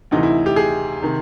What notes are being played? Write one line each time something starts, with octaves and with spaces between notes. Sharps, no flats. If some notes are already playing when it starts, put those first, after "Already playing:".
D2 C3 E3 D#4
E4
G4
G#4
C3 D#3